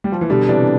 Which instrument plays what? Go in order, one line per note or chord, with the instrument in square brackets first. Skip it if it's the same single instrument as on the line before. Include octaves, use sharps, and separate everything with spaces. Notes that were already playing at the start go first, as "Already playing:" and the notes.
[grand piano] G3
F3
E3
[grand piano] B2 D3 [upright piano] G3
[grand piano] C3 E3 [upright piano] D4